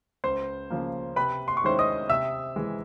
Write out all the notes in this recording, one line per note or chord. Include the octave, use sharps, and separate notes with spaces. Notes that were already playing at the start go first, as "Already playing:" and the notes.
C#2 C5 C6
C#3 F3 A#3
C3 B4 B5
C6
C#6
D#3 G#3 C#4 E4 C5 C6
D#5 D#6
C3 E5 E6
E3 G#3